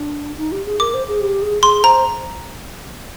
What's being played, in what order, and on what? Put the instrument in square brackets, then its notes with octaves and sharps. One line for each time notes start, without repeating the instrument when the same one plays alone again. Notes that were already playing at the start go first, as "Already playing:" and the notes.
Already playing: [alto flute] D4
D#4
G4
G#4
[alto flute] A#4 [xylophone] D6
[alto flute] C5
G#4
G4
G#4
[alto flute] G#4 [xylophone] C6
[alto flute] C5 [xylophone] A#5